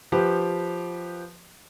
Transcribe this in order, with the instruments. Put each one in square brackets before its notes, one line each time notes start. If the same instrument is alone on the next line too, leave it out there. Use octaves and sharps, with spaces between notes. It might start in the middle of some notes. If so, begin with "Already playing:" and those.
[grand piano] F3 G4 B4